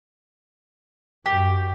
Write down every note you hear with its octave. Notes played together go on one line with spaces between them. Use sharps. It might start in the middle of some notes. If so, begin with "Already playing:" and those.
F#2 G4